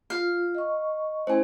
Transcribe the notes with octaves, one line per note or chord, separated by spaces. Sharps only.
F4 F5
D#5 C#6
A3 C#4 E4 C5 G#5